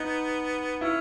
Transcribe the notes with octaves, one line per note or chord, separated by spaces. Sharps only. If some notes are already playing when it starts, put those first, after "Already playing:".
Already playing: B3 D#4
C#4 E4